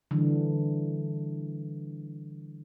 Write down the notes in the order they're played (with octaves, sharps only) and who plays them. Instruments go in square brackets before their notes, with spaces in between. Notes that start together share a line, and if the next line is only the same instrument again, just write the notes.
[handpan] D3 E3 G3